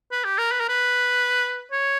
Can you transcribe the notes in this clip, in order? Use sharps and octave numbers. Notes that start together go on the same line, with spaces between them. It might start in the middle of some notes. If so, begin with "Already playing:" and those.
B4
G4
A#4
B4
A#4
B4
C#5